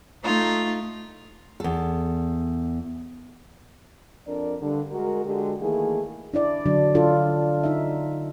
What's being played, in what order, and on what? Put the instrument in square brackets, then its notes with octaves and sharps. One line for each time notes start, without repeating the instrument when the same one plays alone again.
[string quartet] A3 D#4 F4
[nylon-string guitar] E2 A4
[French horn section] F2 D4 A#4 D5
G2 D3
G#3 F#4 A#4
D3 G#3 F#4 G4
D#3 E3 A3 A#3 G#4
[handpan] D4 E4 D5
D3 F#3 D4
D4 F4 A4
D#4 E5